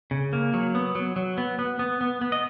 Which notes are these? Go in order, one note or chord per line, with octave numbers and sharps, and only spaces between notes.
C#3
A#3
F#3
B3
F#3
F#3
B3
B3
B3
B3
B3
D#5